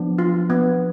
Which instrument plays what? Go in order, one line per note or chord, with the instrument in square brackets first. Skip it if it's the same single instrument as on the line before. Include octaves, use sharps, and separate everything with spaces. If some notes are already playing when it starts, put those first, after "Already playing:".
Already playing: [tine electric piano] F3 B3 D4
[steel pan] F4
B3